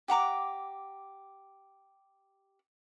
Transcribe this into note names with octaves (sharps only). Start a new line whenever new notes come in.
G4 F#5 A#5 D6